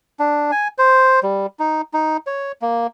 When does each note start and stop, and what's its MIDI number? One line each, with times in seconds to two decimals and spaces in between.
0.19 0.51 62
0.52 0.68 80
0.78 1.20 72
1.23 1.46 55
1.59 1.81 63
1.94 2.17 63
2.27 2.52 73
2.62 2.87 58